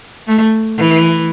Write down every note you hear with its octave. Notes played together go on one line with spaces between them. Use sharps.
A3
E3